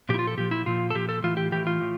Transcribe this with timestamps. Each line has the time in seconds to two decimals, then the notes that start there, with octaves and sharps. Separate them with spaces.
0.09 A#2 F3 G4
0.14 E4
0.19 F4
0.27 A4
0.38 A#2 F3 G4
0.51 E4
0.66 A#2 F3 F4
0.90 A4
0.95 A#2 F3 G4
1.09 A4
1.23 A2 E3 F4
1.37 G4
1.52 A2 E3 G4
1.67 F4
1.81 A2